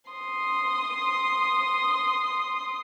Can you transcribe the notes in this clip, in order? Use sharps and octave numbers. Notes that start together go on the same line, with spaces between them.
C6 D#6